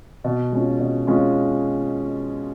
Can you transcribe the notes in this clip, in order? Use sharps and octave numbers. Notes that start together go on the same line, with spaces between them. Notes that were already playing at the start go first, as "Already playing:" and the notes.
B2
G#3 C#4 F4
B2
G#3 C#4 F4